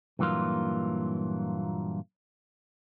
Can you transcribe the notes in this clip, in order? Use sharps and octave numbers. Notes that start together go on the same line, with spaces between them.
G2 A#2 E3 F#3 A#3 F4